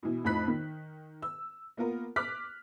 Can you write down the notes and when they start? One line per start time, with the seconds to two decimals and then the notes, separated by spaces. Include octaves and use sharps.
0.03 B2 E3
0.25 F2 A2 D#4 B5 F#6 B6
0.48 D#3
1.22 E6
1.77 A#3 B3 F4 A#4
2.16 D6 F6 F#6 B6